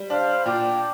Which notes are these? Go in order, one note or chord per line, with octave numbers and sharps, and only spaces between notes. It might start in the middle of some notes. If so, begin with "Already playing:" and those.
Already playing: G3
D4 C5 F5
A#2 D5 G5